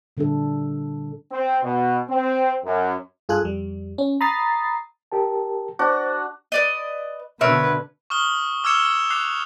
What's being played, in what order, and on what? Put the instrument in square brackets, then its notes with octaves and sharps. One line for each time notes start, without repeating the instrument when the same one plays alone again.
[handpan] A#2 D3 G3 D4 A4
[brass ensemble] C4
B2
C4
F#2
[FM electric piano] G2 F4 G#4 A4 G#5 F#6
F2 G3
C#4
A#5 B5 D#6 A6 C7
[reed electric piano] G4 A#4 A5
[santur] D4 F#4 [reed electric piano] C5
[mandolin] B4 D5 D#5
[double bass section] B2 D3 [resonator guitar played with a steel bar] C4 C#5 E5 [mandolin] A#4 [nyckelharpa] B4
[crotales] C#6 D#6 F6 G7
D6 E6 F6 G#6 C#7 E7
D6 F#6 C7 F7